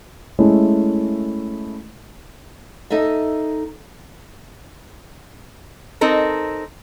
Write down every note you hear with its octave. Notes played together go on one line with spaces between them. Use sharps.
G#3 A3 C#4 E4
D#4 A4 D#5 E5
C4 D#4 A4 A#4